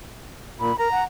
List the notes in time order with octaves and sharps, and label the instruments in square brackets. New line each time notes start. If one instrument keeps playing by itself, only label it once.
[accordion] A#2 [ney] B5
[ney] A#4 [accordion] A#5
[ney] F#5